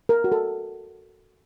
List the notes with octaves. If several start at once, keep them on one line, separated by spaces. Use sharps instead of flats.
A#4
F#4
A4